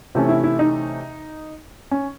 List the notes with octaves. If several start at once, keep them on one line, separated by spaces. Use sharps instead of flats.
C3 E3 A3 C#4
E4
E4
D#4
C#4